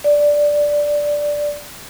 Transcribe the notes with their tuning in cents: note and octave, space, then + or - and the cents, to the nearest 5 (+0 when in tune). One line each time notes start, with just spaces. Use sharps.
D5 +0